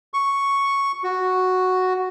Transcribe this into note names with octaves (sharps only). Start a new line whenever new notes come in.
C#6
F#4